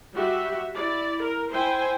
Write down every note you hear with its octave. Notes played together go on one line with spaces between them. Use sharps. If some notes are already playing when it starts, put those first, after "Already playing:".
G3 F#4 G4 E5
E4 D5
A#4
E4 C5 G5 G#5